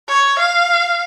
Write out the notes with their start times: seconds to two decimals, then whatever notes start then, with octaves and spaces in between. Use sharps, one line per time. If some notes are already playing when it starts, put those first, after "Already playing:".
0.09 C#5
0.39 F5